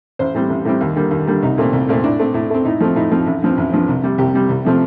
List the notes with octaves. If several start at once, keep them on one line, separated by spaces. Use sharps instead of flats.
A1 C5
A2 G3 C4
A1
A2 G3 C4
D#2
D3 G3 A#3
D#2
D3 G3 A#3
C2 D#4
A#2 A3 C4
C2
A#2 A3 C4
A2 D4
A3 C4
A2
A3 C4
A2 D#4
F3 A3 C4
A2 D#4
F3 A3 C4
A1
G2 F3 C4
A1
G2 F3 C4
C2
C3 G3
C2 G4
C3 G3
C2
C3 F3 A3 C4